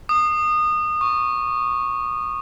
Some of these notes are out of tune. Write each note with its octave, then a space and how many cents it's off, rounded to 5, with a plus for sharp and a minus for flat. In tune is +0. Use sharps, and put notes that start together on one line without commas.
D#6 -25
C#6 -5